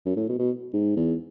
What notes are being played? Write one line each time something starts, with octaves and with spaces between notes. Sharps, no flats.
F#2
A2
B2
B2
G#2
E2